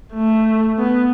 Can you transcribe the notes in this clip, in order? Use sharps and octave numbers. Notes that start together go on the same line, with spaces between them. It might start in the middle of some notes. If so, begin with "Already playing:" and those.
A3
B3